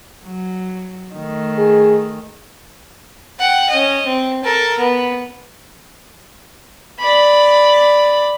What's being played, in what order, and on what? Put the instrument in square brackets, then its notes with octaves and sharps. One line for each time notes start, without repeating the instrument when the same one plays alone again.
[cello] F#3
D#3 A3
[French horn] G#4
[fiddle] F#5 G5
C#4 D#5
C4
A4 A#4
B3
D5 B5